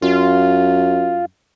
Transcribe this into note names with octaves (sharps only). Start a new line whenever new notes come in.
F#2 F4